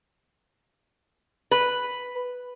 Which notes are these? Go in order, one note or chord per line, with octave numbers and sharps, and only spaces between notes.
B4